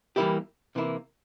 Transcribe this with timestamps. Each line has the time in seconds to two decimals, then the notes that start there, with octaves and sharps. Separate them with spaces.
0.16 E3 G3 A#3 E4 G4
0.75 C3 E3 A#3 E4